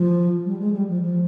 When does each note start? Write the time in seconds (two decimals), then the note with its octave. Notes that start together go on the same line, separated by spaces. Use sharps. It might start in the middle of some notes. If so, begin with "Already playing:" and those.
Already playing: F3
0.44 G3
0.59 G#3
0.73 G3
0.88 F3
1.01 F3